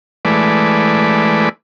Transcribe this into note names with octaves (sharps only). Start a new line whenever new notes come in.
E3 G#3 A3 B4 D5